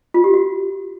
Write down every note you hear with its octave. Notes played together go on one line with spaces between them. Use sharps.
F4
G4
F#4